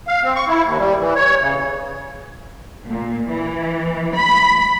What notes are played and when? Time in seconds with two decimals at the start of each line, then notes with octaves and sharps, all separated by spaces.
0.08 F5
0.23 C4
0.36 C#6
0.48 E4
0.65 D#2
0.79 G3
1.00 E3
1.16 C#5
1.41 C#3
2.88 A#2
3.30 E3
4.14 B5